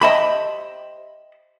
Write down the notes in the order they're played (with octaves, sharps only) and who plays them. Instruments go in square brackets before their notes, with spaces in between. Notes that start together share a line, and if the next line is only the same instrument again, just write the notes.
[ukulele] G4 C5 E5 [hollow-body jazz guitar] D#5 A5 B5